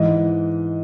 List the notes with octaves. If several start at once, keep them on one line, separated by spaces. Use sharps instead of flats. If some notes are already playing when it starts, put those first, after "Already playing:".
Already playing: G#2 E3 D#5